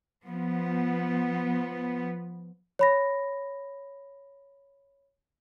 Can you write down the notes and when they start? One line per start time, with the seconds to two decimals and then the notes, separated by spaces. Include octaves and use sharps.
0.25 F3 B3
2.79 C#5 B5 A#6